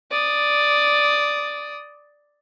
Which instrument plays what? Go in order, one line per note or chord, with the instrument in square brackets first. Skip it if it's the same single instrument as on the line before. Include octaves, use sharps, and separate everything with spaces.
[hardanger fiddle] D5 D#6